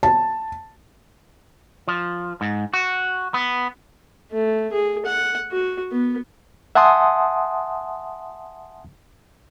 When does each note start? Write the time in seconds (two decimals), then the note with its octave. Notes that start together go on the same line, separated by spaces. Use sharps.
0.03 A5
1.88 F3
2.41 G#2
2.74 F#4
3.34 B3
4.32 A3
4.72 G#4
5.06 F#5
5.51 F#4
5.92 B3
6.75 E5 F#5 G#5 A5 C6 D#6